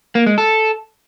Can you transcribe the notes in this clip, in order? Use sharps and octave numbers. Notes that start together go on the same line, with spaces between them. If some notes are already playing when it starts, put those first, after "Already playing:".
A#3
G#3
A4